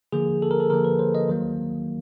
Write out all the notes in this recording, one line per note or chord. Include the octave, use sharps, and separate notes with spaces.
D3 F3 A#3 G#4
A4
A#4
A4
D3 F3 A#3 A#4
B4
C5
D#5
D#3 F#3 A#3